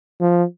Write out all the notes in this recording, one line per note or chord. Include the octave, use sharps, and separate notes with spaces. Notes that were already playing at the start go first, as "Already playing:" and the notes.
F3